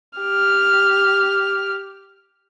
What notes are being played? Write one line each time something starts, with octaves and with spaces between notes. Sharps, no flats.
G4 F6